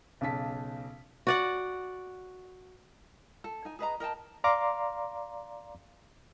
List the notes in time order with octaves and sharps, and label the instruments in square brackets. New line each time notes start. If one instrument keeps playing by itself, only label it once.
[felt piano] B1 C#3 A5 B6
[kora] F#4 D5 F#5
[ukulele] A4
D#4 G#5
G#4 B4 D#5 A#5
A#4 D#5 G5 A5
[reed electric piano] D5 F5 A#5 C6 D6